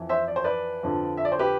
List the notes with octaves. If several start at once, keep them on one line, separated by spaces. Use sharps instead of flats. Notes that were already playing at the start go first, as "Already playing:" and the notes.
Already playing: F2 E3
C5 E5
D5
C5
B4 D5
F2 D3 F3
E5
D5
C5
G4 B4